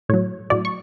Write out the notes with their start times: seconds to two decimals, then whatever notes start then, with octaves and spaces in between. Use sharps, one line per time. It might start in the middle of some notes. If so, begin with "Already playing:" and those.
0.09 A2 F#3 C#5
0.50 A2 F#3 D5
0.65 C#6